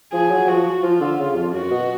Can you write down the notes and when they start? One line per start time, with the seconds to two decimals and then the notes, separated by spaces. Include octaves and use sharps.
0.13 F3 G#4
0.31 F#3
0.48 F3 F#4
0.83 F3 F4
1.01 D3
1.19 C#3
1.35 F2
1.53 F#2 F#4
1.71 B2